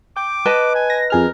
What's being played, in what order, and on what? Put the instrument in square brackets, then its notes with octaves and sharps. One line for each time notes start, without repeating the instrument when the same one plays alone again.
[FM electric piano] G5 [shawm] D6
[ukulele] B4 D#5 A5
[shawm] G#5
[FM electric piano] A#6
[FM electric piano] F2 G#4 F6 [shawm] A#4